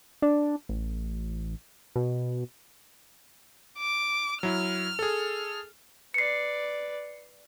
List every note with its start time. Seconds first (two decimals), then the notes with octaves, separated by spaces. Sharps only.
0.22 D4
0.69 A1
1.96 B2
3.79 D6
4.43 F#3 E4 F6
4.99 G#4 A4
6.14 B4 D5 C7 C#7